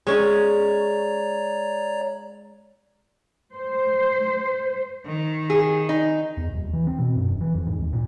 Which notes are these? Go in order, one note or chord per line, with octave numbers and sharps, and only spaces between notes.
G#3 C#4 C#5 D5 A#5
C5
D#3
G#4
D#4
E2
D#1
E3
C4
B2
F#2
E1
E3
F2
G#2
D#2
A#2